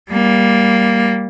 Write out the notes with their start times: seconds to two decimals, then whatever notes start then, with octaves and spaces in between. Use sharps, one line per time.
0.11 G3 A#3